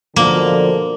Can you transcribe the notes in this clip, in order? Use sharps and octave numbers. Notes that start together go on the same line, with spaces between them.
B2 D3 F3 A#3